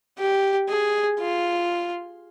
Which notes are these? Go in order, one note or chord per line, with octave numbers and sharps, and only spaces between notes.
G4
G#4
F4